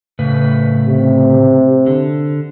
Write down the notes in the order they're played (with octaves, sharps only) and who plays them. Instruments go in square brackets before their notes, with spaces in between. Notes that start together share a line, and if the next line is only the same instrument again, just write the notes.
[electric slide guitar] A2 C#3 B4
[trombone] C3
[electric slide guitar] D3